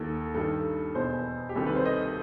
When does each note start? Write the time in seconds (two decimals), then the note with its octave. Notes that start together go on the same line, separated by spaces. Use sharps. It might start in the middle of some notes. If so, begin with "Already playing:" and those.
Already playing: D#2 D#3 A4
0.34 G2 D#3 A4
0.95 E2 B2 C5
1.49 G4
1.55 C2 C3 D#3 A4
1.66 B4
1.76 C5
1.86 D#5